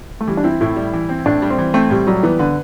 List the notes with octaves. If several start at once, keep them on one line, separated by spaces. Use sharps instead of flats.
A3
E3 G3
D4
C4 E4
A2 E4
G3
E3
C4
A2 D4
G3
C4
E3
A3 C4
A2 G3
F#3 G3
E3 B3
D3 B4